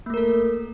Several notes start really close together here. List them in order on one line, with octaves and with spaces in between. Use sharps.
A#3 A3 A#4 A4